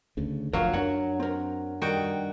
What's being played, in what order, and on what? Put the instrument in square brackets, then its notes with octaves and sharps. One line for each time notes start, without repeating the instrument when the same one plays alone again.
[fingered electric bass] D2 C#3
[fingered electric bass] F#1 D2 F3 [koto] F#3 [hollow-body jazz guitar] A#4 F5
[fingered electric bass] F#2 C#4 D4 [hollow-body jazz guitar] A#4 C#5 F#5
[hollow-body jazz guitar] C4 A#4
[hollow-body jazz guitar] G2 [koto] D#3 F#4 G5